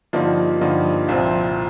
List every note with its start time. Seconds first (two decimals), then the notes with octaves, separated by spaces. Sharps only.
0.13 G2 D3 F3 A#3 D#4
0.61 G2 D3 F3 A#3 D#4
1.08 C2 A#2 F3 C4